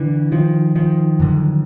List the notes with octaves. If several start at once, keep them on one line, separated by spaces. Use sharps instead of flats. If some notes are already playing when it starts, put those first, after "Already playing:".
Already playing: D3 E3
D#3 F3
D#3 F3
F#2 D3